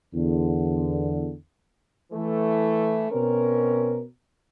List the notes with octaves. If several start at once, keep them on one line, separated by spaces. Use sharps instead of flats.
E2 D3
E3 A3
B2 C4 C#4 A#4